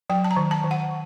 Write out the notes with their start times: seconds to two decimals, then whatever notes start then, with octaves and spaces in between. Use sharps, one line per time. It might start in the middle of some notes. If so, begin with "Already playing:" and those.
0.10 F#3 G5
0.24 A5
0.31 A#5
0.37 D#3
0.51 A5
0.64 D#3
0.71 F#5